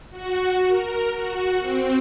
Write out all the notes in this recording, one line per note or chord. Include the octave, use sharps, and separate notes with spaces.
F#4
A#4
F#4
C4